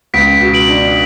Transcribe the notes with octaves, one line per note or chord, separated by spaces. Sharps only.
C#2 B6 D7
B2
D7 F#7
D4